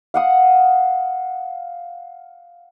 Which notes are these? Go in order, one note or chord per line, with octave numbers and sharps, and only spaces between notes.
F5 F#5 D#6